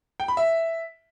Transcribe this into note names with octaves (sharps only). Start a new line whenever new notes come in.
G5
B5
E5